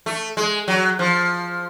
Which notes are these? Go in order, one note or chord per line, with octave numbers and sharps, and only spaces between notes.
A3
G#3
F#3
F3